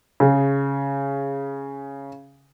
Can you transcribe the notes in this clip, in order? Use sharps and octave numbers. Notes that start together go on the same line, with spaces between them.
C#3 G#4